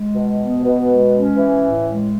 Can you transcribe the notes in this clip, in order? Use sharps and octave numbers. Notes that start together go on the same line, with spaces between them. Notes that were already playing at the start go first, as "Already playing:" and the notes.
Already playing: G#3
B2
B3
B2
G#3
C#4
E3
A2
G#3